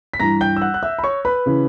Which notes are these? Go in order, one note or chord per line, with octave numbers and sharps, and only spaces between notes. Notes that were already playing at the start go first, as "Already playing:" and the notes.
B6
G2 E3 A#5 A#6
G5 G6
E6
F#5 F#6
F#6
E5 E6
B5
C#5 C#6
B4 B5
C#3 E3